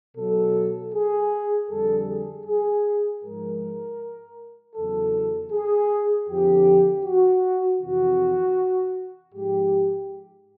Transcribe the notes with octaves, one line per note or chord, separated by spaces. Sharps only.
B2 F#3 A4
G#4
F2 D3 G3 A4
G#4
G#4
G#2 F3 G#3 A#4
E2 C#3 F#3 A4
G#4
F2 D3 F3 G4
F#4
F2 C3 E3 F#4
G#2 F3 G#3 G4